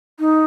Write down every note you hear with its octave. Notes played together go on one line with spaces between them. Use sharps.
D#4